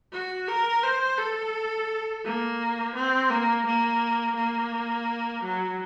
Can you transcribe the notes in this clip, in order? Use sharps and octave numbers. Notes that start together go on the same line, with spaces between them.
F#4
A#4
C5
A4
A#3
C4
A#3
A#3
A#3
F#3